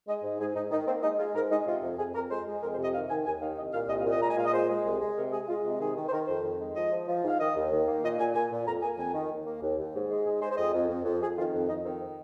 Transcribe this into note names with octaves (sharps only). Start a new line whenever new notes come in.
G#3 D#5
G#2
G#2 G#4
G#2 D#4
D#3 D#4
A#3 C4
G#3 D#4
G#3 F4
G#2 A#4
G#3 D#4
C3 F4
F2
F2 G#4
F2 A#4
G#3 C5
G#3
F2 A#4
C5
C3
D#5
D#3 F5
D#3 G#5
D#2 G#5
D#3 F5
C2 D#5
A#2 F5
C2 D#5
F5
A#2
D#5
G#3 A#5
G#5
A#2 F5
D#5
G#3 C5
G#3
C2
G#3
C3 A#4
G#3 G#4
G#3 F4
C3
D#3 G#4
D#3
C5
D#3 A#4
F2 C5
D#3
G#3
F3 D#5
F3
F3
G#2 F5
D#3 D#5
D#2
D#3
A#3
A#2 D#5
A#2 G#5
A#2 G#5
A#2
F2 A#5
A#3 G#5
F2 G#5
D#3
D#2
A#3
D#2
D#2
G#2
G#3
G#2 G#4
G#3 C5
C5
F2 D#5
F2
F2
F2
F2 G#4
D#3 F4
F2
F2 D#4
D#3 C4
C4